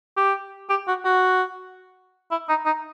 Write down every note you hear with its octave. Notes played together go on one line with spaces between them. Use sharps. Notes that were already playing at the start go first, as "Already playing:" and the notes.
G4
G4
F#4
F#4
E4
D#4
D#4